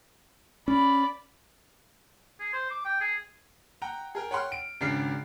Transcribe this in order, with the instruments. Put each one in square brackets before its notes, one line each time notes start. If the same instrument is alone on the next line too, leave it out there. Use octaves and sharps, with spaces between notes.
[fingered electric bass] C#4 [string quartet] D5 B5
[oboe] G#4
C5
D6
G5
G#4
[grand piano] F#5 G5 A#5
G#4 A#4 G5
C#5 F#5 G5 C6 F6
D7
G#1 C#3 D4 F6 C7